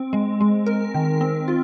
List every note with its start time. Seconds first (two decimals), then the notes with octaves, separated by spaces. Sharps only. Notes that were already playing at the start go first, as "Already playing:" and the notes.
Already playing: C4
0.13 G#3
0.41 G#3
0.67 A#4
0.94 D#3
1.21 C4
1.48 F4